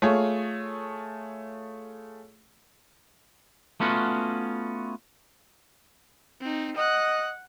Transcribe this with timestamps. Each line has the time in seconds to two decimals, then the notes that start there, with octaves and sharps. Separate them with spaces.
0.02 A3 F4 G#4 C#5
3.80 A3 B3 C#4 F4 F#4
6.41 C4 D#4
6.77 D#5 F#5 F#6